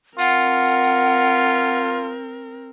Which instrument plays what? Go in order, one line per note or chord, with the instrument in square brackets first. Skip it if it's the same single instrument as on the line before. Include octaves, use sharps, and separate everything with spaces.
[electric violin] C4 A#4 [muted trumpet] F4 [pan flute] F#5